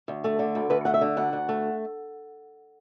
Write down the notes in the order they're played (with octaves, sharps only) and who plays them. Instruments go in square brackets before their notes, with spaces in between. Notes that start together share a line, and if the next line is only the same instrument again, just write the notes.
[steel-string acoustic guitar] D2
A3
D3
D2
D2 B4
A3 F#5
E5
D3
D2 F#5
D2
A3